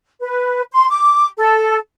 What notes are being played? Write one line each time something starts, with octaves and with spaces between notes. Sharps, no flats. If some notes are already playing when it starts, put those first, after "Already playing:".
B4
C6
D6
A4